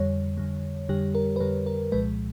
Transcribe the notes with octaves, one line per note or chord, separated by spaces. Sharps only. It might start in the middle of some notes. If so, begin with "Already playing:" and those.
Already playing: F2 D3 G3 C#5
F2 D3 G3
F2 D3 G3 G4
A#4
B4
F2 D3 G3 A#4
A#4
C2 A#2 F3 G#3 B4